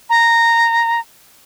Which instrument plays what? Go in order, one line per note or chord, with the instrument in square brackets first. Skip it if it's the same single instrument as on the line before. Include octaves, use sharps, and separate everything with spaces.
[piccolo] A#5